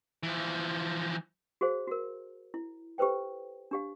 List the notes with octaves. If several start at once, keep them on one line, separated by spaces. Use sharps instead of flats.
E3 F3
F#4 G#4 C5 F5
F#4 A#4
E4
G4 A4 B4 C5 G5
D4 G4 F5